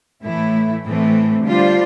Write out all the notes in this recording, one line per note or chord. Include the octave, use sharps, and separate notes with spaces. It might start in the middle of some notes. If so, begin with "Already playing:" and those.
A2 E3 A3 E4
A2 E3 A3 C4
D3 G3 D4 F4 C5